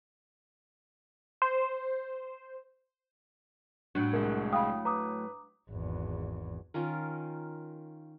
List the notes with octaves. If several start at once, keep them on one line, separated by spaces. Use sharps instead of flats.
C5
A2 F#3 D4
C2 G#3 A#4
F5 G5 B5 D#6
B4 A#5 D6 D#6
G#1 E2
D#3 C#4 F4 A#4